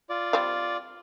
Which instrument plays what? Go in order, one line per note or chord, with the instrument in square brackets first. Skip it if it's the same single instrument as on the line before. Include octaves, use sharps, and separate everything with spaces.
[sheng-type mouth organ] F4 D5
[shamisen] G3 C4 F5